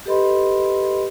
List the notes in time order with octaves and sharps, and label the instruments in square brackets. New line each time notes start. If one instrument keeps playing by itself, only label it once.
[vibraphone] G4 A4 B4 D#5 B5 C6